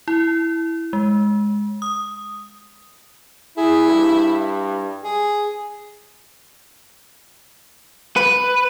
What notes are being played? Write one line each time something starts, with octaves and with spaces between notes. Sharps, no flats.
E4
G#3
D#6
E4 G#4
G2
G#4
B4